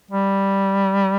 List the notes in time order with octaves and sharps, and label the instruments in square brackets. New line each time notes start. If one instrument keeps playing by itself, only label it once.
[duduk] G3